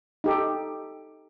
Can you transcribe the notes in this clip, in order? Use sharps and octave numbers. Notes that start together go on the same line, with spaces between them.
D#4 G4 A4